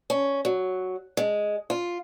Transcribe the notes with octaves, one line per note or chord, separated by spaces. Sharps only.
C#4
F#3
G#3
F4